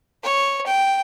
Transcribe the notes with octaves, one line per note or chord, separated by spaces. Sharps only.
C#5
G5